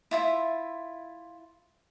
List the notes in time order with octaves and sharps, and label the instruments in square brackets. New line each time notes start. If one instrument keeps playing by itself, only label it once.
[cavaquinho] E4 F4 E5